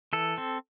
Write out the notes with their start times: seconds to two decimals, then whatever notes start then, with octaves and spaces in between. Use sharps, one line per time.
0.13 E3 A4
0.38 C4